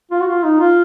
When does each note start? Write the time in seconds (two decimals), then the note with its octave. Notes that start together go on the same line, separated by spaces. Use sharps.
0.11 F4
0.20 F#4
0.28 F4
0.44 D#4
0.60 F4